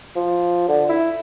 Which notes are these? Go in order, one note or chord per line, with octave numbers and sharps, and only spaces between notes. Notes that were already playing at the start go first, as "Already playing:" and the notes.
F3
D3
E4